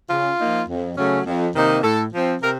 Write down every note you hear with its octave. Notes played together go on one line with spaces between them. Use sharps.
C#3 F4
F3 A#3 D#4
F2
C#3 F#3 A3 C#4
F2
C3 D#3 A#3 D#4
A2 A4
F3 C4
C3 A#4